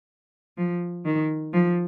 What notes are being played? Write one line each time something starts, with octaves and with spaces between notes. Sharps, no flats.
F3
D#3
F3